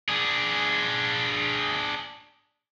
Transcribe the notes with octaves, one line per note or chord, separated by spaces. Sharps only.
D4 G#4